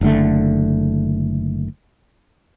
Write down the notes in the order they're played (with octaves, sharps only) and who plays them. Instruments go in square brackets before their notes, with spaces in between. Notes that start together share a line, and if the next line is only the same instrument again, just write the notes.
[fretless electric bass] F#1 D3 A3